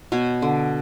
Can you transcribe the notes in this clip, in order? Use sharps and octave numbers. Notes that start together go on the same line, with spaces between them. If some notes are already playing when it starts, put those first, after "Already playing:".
B2 C#5
D3